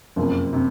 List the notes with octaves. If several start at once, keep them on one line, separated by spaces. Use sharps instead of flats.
F#1 F2 C3
C3